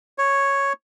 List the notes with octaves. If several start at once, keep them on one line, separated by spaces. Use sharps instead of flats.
C#5